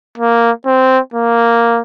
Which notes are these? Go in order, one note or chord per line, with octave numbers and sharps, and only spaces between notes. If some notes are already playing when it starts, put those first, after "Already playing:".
A#3
C4
A#3